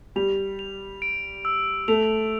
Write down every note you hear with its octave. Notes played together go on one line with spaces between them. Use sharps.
G3 F7
F7
D7
E6
A3 F7